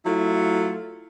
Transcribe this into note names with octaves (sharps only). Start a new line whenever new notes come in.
F#3 A3 E4 F4